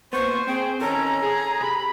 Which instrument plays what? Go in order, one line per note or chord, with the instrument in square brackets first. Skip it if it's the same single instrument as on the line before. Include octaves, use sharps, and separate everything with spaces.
[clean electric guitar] A#2 B3 [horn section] C5 [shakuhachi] C#6
[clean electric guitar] C4 [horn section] G#4 C5 [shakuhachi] G5
[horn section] D#3 C#4 [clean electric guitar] A4 C#5 A5 [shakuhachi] A#5
[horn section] G#4
[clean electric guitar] C3 [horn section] B5